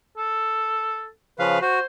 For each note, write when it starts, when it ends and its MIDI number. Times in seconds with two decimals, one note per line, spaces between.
0.18 1.07 69
1.39 1.59 49
1.39 1.59 53
1.39 1.60 71
1.39 1.59 77
1.62 1.79 66
1.62 1.85 72